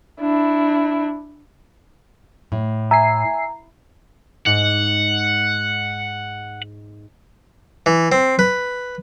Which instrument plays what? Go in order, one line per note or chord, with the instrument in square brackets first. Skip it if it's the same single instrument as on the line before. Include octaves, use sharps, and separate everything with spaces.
[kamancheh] D4 E4
[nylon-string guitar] A2
[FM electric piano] E5 G#5 C7 [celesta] A#5
[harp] G#2 [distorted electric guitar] F#5
[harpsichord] E3
C4
B4